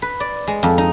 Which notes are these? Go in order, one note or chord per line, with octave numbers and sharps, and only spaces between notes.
B4
D5
G#3
F2
D#4